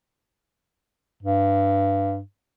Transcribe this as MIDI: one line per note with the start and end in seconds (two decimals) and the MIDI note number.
1.23 2.20 43